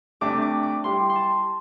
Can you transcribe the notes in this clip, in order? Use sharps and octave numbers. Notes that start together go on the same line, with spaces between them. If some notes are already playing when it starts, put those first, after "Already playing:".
C3 A3 D4 G4 D6
D6
D6
G3 E4 G4 C6
C6
A5